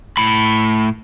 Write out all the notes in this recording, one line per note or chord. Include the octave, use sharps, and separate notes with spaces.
A2 B5